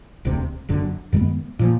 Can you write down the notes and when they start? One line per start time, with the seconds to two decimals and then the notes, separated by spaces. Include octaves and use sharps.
0.25 E1 D2 C3
0.69 F#1 F#2 D3
1.13 F#2 D#3 G#3 B3
1.59 A#2 F3